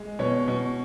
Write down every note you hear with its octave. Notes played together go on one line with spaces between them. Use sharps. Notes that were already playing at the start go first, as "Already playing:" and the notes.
Already playing: G#3
B2 C#5
B2